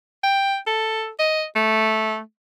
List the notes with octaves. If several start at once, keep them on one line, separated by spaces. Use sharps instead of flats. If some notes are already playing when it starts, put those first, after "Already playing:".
G5
A4
D#5
A3